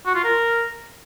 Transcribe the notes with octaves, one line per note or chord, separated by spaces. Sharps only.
F#4
F4
A#4